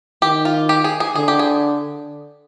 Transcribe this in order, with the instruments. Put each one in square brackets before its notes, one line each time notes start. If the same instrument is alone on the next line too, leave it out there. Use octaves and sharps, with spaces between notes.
[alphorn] D#3 [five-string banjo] G4
[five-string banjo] F4
G4
G#4
G#4
[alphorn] D3 [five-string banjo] G#4
[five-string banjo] G4
G#4